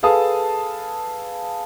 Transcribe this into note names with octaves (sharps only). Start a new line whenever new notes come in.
G#4 A4 B4 F5 A5 D#6